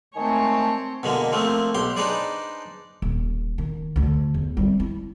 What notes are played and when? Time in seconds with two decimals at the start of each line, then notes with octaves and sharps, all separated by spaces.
0.16 D#3 G#3 A3 C4 C#5 G#5 A5
1.03 B2 D3 G#3 A#3
1.32 F3 A3 A#3 C4
1.75 B1 G4 C6
1.97 D4 D#4 G#4 B4 C5 D5
3.02 D#1
3.58 D#3
3.96 D2 D3
4.34 E2
4.57 G3 C4
4.80 E4